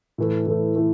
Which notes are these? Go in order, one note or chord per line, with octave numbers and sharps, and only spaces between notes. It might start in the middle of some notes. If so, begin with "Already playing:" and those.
A2 E3 A3
A2 E3 A3
E3 A3